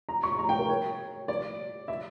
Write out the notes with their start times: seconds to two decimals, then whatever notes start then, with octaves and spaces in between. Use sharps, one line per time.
0.09 A#5
0.23 C#6
0.39 A#5
0.49 G5
0.59 A#4
0.69 C#5
1.28 D5
1.88 E5